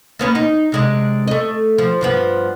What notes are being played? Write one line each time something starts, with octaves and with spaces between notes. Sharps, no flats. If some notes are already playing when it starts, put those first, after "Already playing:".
A#3 B3 C#4
D#4
C3 G#3 D4
A3 D#5
F3
G2 F3 B3